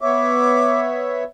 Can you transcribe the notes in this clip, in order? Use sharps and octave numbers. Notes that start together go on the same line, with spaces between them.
B3 C#5 E5 D6